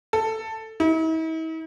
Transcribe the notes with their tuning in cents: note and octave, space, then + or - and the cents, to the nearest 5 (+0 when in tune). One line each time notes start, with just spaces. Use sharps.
A4 +10
E4 -45